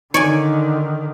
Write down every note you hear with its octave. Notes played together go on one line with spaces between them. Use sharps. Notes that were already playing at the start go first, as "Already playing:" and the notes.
D3 D#3 D#4 C#5 D5 G#5